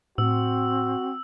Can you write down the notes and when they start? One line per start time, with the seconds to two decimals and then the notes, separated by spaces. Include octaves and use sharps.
0.18 A2 C4 F#4 E6